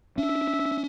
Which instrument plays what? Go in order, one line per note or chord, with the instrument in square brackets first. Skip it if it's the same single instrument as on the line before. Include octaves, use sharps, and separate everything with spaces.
[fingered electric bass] C#4 D4 [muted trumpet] E5